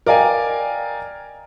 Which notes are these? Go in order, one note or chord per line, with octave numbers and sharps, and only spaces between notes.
A#4 D5 D#5 F5 G5 G#5